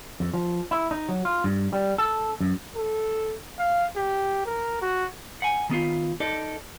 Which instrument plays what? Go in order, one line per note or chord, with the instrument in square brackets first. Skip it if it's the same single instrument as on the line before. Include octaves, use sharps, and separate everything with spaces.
[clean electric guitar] F2
F3
E4
D#4
F#3
F4
G2
G3
A4
F#2
[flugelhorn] A4
F5
G4
A#4
F#4
[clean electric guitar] F#5 G#5
D#3 B3 F4
D#4 A4 D5